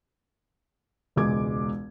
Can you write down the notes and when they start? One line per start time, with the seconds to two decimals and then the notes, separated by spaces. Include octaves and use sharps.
1.16 E1 C#2 G#3 G#4 D6 G#6